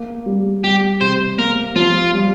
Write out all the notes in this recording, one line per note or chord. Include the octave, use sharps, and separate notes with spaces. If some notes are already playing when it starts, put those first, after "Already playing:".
Already playing: A#3
G3
G3 G4
C3 C5
A#3 A#4
F3 F4
G3